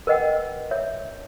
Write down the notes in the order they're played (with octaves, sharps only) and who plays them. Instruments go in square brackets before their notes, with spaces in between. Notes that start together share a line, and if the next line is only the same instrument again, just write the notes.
[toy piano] A#4 B4 D#5 F#5 G5
C#5 E5